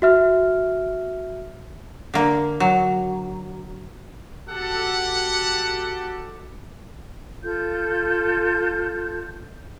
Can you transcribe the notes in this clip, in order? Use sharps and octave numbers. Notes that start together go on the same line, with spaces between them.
F#4 E5 F6
D3 A#3
F#3
F#4 G4 A4 F#5
F4 A4 G6